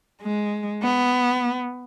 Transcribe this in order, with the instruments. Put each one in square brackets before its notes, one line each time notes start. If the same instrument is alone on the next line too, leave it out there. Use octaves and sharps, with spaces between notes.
[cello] G#3
B3